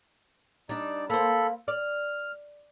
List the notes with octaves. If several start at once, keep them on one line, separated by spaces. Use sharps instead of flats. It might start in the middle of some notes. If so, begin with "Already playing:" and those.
G3 D4 D#4 D5
A#3 A4 C5 B5
D5 F6